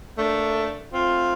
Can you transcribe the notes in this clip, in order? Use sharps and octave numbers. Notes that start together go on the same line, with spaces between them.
A3 A#3 D4
A3 C4 F4